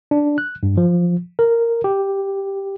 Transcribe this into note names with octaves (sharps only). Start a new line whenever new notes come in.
D4
F#6
G2
F3
A#4
G4